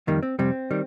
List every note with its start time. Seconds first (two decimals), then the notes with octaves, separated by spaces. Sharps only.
0.07 F2 D#3 G3 A#3
0.23 C4
0.39 F2 C3 G3 C4
0.71 D#3 G3